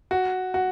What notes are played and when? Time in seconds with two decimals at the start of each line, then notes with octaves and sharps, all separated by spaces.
0.11 F#4
0.54 F#4